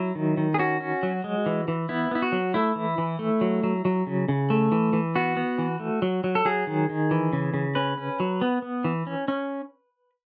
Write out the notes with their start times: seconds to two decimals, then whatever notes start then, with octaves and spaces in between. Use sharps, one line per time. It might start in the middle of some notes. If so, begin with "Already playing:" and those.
Already playing: F#3 E4
0.15 D#3
0.37 D#3
0.54 G#4
0.58 C#4 F#4
0.80 C#4
1.03 F#3
1.24 G#3
1.46 E3
1.68 E3
1.89 B3 E4
2.11 B3 E4
2.22 F#4
2.32 F#3
2.54 A3 E4
2.76 E3
2.98 E3
3.19 A3
3.41 F#3
3.63 F#3
3.85 F#3
4.07 C#3
4.29 C#3
4.50 A3
4.72 E3
4.93 E3
5.15 B3 F#4
5.37 B3
5.58 E3
5.80 A3
6.02 F#3
6.24 F#3
6.35 A4
6.45 F#3 G#4
6.67 D#3
6.89 D#3
7.11 E3
7.33 C#3
7.54 C#3
7.75 C#4 B4
7.98 C#4
8.20 F#3
8.41 B3
8.62 B3
8.84 E3
9.07 C#4
9.28 C#4